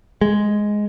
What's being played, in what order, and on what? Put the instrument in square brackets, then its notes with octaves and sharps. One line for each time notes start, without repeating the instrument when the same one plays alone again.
[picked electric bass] G#3